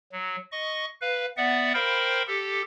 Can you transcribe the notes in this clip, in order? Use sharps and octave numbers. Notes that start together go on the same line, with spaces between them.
F#3
D#5 C#6
B4 F5
B3 D5 E5 F#5
A#4 C5 F5 G5 B5
G4 A4